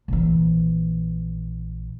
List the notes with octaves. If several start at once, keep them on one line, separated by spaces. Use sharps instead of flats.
A#1 E3